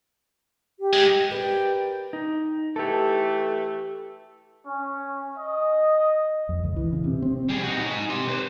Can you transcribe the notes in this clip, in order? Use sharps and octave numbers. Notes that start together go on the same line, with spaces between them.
G4
G#2 G#3
G4 A#4 B4 D5 G5
D#4
E3 A3 G4 A4
C#4
D#5
F2
C#2
E3
C#3
C3
C4
G3 G#4
D#4 F#4
D#4 G#5
G4 C6
B4 C5